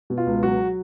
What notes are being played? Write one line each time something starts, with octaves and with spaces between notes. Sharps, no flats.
B2
F4
C#2
F#3 F#4